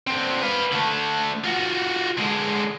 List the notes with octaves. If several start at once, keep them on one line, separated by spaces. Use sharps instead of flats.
D3 C4
B4 F5
D3 A3
F4 F#4
D3 G#3